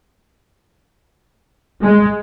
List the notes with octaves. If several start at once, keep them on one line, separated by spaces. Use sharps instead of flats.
G#3